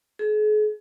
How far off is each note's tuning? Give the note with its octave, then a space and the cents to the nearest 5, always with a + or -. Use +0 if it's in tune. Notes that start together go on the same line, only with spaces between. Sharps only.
G#4 +40